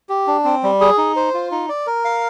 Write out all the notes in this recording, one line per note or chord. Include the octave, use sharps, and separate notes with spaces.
G4
D4
C4
G3
G#4
D#4
C5
F4
D#4
D5
A#4
F5